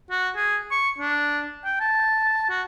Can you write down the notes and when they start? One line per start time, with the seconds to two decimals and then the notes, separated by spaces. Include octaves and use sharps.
0.11 F#4
0.36 G#4
0.71 C#6
0.98 D4
1.64 G5
1.80 A5
2.50 F#4